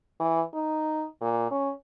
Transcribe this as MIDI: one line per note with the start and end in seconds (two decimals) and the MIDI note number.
0.20 0.41 52
0.54 1.05 63
1.21 1.47 46
1.51 1.72 61